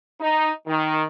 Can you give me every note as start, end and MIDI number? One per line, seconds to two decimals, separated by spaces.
0.20 0.50 63
0.67 1.03 51